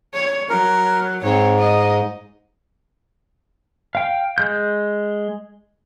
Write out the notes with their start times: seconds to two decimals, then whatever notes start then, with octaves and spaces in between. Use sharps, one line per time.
0.14 C#5
0.50 F#3 A#4
1.23 G#2 C4 C#5
1.59 D#5
3.95 F5 G5
4.38 G#3 G6